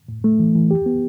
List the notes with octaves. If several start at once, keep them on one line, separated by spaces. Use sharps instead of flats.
A2
A3
E3
E3
G4
B3